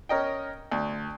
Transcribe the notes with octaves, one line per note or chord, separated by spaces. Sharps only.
C#4 A#4 D#5 G5
D2